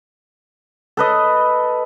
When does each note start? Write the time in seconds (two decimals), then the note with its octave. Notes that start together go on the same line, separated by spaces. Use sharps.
0.97 A4 B4 D#5